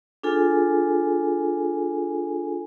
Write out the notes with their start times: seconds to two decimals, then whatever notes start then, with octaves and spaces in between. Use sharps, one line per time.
0.23 D4 F4 G#4 A4 G#5